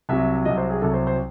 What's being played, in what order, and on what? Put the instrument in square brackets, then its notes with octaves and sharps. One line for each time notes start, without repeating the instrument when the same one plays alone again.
[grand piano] C2 C3 F#3 E5
C2 C3 F#3 D#5
C5
G#4
C2 C3 F#3 A4
C5
C5